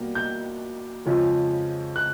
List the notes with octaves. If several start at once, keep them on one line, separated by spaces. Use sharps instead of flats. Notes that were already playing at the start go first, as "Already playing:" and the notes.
Already playing: B2 G3 A#3
G6
F2 C#3 F3 G#3
F#6